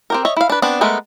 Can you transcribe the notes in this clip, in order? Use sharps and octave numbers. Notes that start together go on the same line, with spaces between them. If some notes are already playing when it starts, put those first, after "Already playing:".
C4 G4 A#4
C#5 D#5 E5
E4 F5
D4 B4
B3 C4 D4
G#3 A3 B3 A4 A#4